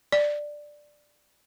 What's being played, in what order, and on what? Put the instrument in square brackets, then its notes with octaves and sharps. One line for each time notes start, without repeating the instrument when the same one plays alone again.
[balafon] D5